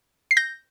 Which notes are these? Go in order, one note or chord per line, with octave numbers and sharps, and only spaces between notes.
C7
G6 A#6